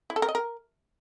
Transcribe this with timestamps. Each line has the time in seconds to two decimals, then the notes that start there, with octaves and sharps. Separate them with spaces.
0.10 E4
0.16 A4
0.22 A#4
0.29 D#5
0.35 A#4